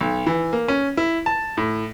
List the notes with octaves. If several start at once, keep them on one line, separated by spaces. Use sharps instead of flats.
B1
E3
A#3
C#4
E4
A5
A2